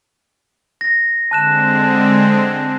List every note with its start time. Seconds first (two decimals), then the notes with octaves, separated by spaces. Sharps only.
0.81 A#6
1.31 D3 G#3 C4 A5 F#6 E7